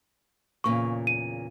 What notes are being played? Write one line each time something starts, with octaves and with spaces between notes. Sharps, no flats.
E2 A#2 C#3 C#6
D#7